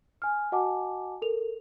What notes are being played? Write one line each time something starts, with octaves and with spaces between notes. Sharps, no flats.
G#5 F6
F#4 D#5 F#5 G#5 A5 D6
A4 A#4 F7